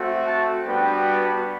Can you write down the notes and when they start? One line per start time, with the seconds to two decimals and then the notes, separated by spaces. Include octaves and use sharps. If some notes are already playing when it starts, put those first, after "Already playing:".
Already playing: A3 C4 F#4
0.26 A5
0.66 G3 B3 D4 F#4 G5